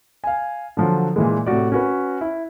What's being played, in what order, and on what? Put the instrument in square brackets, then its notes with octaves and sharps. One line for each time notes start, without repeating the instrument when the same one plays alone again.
[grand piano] F5 G#5
D3 F3 F#3
A#2 E3 G#3
A2 C3 F#4 D5
C#4 F#4 B4
E4